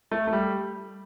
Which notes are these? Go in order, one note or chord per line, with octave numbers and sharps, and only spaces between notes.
A3
A3
G3